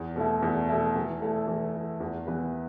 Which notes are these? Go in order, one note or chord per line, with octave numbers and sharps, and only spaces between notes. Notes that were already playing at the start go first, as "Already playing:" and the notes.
Already playing: E2
B2 A3 E4
E2
B2 A3 E4
E3
A3 E4
E3
A3 E4
E2
E3 B3 E4 B4